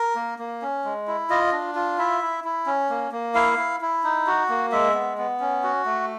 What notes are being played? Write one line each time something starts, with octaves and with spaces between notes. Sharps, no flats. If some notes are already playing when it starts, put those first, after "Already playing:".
Already playing: A#4
A#3
A#3
C#4
G#3
E4
F4 D#5
D4
F4
E4 E5
E4
E4
C#4
A#3
A#3
E4 F5
E4
E4
D#4
F#4
A#3
G#3 E5
B3
B3
C#4
F#4
A3